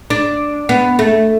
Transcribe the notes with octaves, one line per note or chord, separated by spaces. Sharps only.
D4
B3
A3